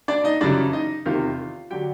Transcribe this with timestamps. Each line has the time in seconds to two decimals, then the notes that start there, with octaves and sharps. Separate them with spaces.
0.08 D4 D5
0.24 D#4 D#5
0.41 F#2 C#3 E3 G3 D4 D5
0.73 D#4 D#5
1.06 E2 C3 D#3 F4 F5
1.70 D3 F#3 G4 G5